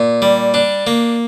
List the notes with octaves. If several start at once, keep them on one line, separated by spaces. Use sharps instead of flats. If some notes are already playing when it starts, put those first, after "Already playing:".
Already playing: A#2
G3
D4
A#3